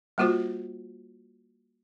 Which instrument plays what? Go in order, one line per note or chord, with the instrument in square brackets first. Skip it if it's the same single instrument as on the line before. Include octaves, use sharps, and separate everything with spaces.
[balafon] G3 A#3 F4 F#4 C5